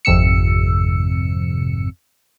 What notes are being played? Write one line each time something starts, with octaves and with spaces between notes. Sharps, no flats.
G#1 F2 C3 E6 C#7